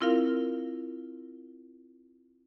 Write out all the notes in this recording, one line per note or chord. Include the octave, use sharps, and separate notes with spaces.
C4 E4 F4 A#4 F5